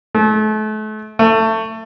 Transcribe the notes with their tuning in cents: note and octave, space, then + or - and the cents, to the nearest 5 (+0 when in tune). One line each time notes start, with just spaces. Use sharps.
A3 -35
A3 +20